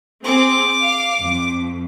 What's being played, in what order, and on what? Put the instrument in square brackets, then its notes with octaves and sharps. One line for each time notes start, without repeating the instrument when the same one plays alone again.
[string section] C4 G#4 [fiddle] D6
[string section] F5
F2